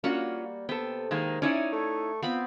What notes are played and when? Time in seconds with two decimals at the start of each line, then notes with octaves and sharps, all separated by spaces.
0.04 G3 A#3 C#4 F4 F#4 F#5
0.69 C3 B3 A4 G5
1.11 D#3 G#3 A#3
1.42 C#4 D#4 E4 C#5 D5
1.72 A3
2.23 B3 C4 F4 B5